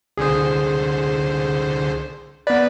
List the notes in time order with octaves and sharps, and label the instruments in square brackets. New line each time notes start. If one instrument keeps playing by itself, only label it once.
[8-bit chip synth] C2 D3 C5 [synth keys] G#4
[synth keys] B3 D5 [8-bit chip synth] B4